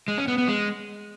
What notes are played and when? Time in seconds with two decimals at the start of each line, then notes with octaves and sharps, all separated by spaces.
0.08 G#3
0.18 C#4
0.28 B3
0.38 B3
0.48 G#3